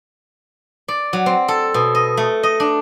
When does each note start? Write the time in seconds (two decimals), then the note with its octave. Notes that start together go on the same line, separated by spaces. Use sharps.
0.88 D5
1.13 F#3
1.26 C4
1.48 A4
1.74 B2
1.95 D#5
2.17 A3
2.43 D#5
2.60 D4